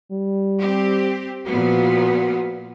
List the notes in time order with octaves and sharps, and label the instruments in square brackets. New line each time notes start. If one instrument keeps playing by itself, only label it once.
[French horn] G3
[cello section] C4 G4
[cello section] A#2 F3 B3 [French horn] F#4